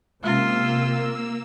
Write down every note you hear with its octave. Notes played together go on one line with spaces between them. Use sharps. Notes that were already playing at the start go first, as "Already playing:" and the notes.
C3 G#3 A#3 C#4 F4 E6